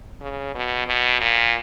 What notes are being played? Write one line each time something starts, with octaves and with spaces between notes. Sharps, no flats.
C#3
B2
B2
A#2